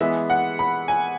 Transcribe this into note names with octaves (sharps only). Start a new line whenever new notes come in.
E3 G#3 B3 E5
F#5
B5
G#5